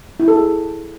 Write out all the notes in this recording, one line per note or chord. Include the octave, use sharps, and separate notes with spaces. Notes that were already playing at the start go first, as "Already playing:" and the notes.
E4
A4
G#4